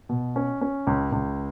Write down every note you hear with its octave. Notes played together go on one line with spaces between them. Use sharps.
B2
C#4
C#4
C#2
C#2